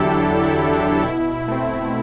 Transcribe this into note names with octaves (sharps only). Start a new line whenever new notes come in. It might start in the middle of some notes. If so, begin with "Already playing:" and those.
Already playing: E2 D3 F#3 D4 E4 G4 A4
E2 D4
E4
D3 F#3
D4
B2 E4
A3 C4